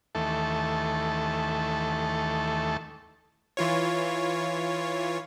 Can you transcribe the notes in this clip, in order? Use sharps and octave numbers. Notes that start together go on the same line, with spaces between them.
D#2 E3 A3 A4
E3 F4 C#5